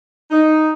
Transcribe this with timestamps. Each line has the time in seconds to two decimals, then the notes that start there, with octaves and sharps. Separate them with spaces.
0.31 D#4